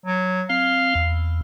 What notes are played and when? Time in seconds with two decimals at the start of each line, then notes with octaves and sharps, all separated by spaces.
0.06 F#3
0.50 C4 F5
0.95 E2